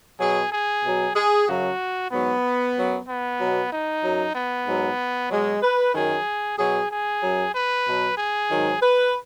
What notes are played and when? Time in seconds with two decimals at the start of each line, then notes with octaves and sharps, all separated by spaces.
0.20 B2 F#3 G#4
0.52 G#4
0.84 B2 F#3
1.16 G#4
1.47 F#2 C#3 F#3 F#4
2.11 G#2 F#3 B3
2.75 F#2 F#3
3.07 B3
3.39 B2 F#3
3.71 D#4
4.02 F#2 F#3
4.35 B3
4.67 G#2 F#3
5.31 B2 F#3 G#3
5.63 B4
5.95 F#2 D#3 F#3 G#4
6.58 B2 F#3 G#4
6.90 G#4
7.22 F#2 F#3
7.54 B4
7.86 B2 F#3
8.18 G#4
8.50 G#2 D#3 F#3
8.82 B4